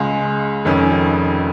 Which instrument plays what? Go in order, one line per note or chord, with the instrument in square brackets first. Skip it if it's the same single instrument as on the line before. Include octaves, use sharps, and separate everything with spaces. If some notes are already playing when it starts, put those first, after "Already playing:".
Already playing: [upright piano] C#2 C#3 G#3
F1 F2 D#3 C#4